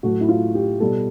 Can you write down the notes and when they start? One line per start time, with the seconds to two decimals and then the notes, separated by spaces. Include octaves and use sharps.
0.03 A2 F#3 A3 F#4
0.21 E4
0.29 F4
0.55 G4
0.80 B2 G3 A4